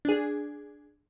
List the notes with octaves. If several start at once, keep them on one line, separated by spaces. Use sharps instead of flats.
D4 G#4